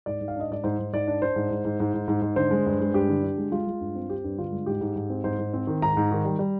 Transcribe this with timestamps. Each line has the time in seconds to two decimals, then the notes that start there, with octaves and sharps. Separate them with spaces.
0.06 G#2 D5
0.21 G#2
0.28 F5
0.36 D4 D#5
0.50 G#2 D5
0.64 G#2 C5
0.79 G#2
0.93 G#2 D5
1.08 D4
1.22 D4 C5
1.36 G#2
1.51 G#2
1.65 G#2
1.80 G#2
1.94 G#2
2.08 G#2
2.22 G#2
2.36 D3 C5
2.51 G#3
2.66 G2
2.80 G#3
2.94 G2 G4
3.09 D3
3.23 D3
3.38 G#3
3.51 G#3 F4
3.67 G#3
3.81 G2
3.95 C4
4.09 C4 G4
4.24 G2
4.38 D3 F4
4.52 G#3
4.66 G#2 G4
4.81 G#2
4.96 G#2
5.10 C4
5.24 G#2 C5
5.38 G#2
5.54 C4
5.67 D#3
5.82 G#2 A#5
5.97 G#2
6.11 D#3
6.25 G3
6.39 G3